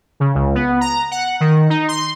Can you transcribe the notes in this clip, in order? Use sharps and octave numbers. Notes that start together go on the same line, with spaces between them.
C#3
C#2
B3
A#5
F#5
D#3
D#4
C6